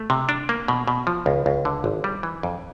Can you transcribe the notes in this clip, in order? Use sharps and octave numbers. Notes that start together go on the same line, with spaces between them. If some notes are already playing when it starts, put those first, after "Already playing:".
Already playing: A3
C3
D4
A#3
B2
B2
F3
C#2
C#2
D3
G#1
G3
E3
F2